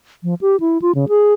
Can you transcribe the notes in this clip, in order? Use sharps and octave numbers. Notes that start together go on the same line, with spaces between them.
F3
G4
E4
F4
C#3
G#4